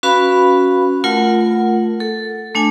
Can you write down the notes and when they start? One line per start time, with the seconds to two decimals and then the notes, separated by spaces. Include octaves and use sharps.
0.03 C#4 F#4 B4 F5 B5
1.04 A3 F4 A#4 F#5
2.00 A4
2.55 A3 D4 G#5